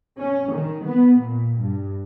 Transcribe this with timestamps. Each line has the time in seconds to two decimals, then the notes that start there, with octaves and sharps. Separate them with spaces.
0.18 C#4
0.52 D#3
0.84 B3
1.18 A#2
1.58 G2